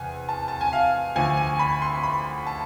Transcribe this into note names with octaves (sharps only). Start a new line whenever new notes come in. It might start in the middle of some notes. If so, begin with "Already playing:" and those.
Already playing: E2 C3 G#5
A5
A5
G#5
F5
D2 D3 F3 G#5
G#5
B5
C6
B5
A5